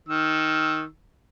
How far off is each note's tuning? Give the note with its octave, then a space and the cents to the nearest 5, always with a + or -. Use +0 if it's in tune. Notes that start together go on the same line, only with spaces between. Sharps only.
D#3 +5 E6 +0